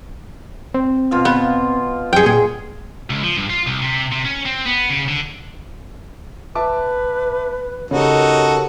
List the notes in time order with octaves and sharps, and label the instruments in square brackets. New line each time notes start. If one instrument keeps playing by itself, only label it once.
[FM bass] C4
[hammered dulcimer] B2 F4 F5
[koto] B3
[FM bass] F#2 [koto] G#4 G5
[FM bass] A#2 [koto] G#4
[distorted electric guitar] C#2
F3
G2
F4
C2
C3
C3
C#4
C4
B3
C#3
D3
[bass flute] B4 [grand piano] E5 A5 D6
[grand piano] C#3 [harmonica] D#4 F#4 A4 [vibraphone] G4 A#4 C#5